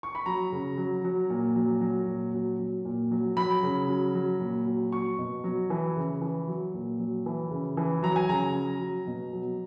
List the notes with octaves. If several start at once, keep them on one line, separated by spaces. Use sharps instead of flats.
C#6
B5
F#3 A#5
C#3
F#3
F#3
A#2
F#3
F#3
A#2
F#3
F#3
A#2
F#3
F#3 B5
C#3
F#3
F#3
A#2
F#3
F#3 C#6
B2
F#3
E3
C#3
E3
F#3
A#2
F#3
E3
C#3
E3
F#3 A#5
G#5
C#3 A#5
F#3
F#3
B2
F#3